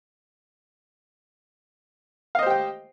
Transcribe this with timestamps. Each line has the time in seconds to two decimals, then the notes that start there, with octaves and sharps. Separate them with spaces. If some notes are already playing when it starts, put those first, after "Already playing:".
2.35 F5
2.39 D#5
2.42 C5
2.46 G4
2.50 G5